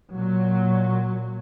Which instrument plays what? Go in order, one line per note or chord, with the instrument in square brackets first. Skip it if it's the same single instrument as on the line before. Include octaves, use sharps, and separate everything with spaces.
[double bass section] A#2 F#3